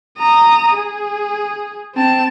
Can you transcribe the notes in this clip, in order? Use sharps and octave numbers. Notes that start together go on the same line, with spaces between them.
A#5 D#6
G#4
C4 A5